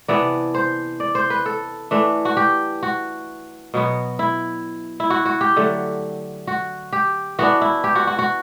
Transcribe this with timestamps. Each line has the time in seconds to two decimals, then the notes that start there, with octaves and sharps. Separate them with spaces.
0.08 C3 E3 B3 D4 D5
0.54 C5
1.00 D5
1.15 C5
1.30 B4
1.46 A4
1.91 E3 A3 D4
2.25 F#4
2.37 G4
2.83 F#4
3.74 B2 F#3 B3
4.19 E4
5.00 E4
5.10 F#4
5.25 F#4
5.41 G4
5.56 D3 F#3 A3
6.47 F#4
6.93 G4
7.39 E3 B3 D4 F#4
7.61 E4
7.84 G4
7.95 F#4
8.07 F#4
8.19 F#4